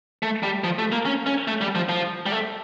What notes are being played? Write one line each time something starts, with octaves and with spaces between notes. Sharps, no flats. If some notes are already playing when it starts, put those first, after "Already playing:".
A3
G3
F3
A3
A#3
C#4
C#4
A3
G3
F3
F3
G3
A3